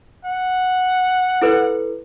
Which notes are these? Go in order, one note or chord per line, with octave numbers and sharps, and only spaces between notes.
F#5
E4 A4 B4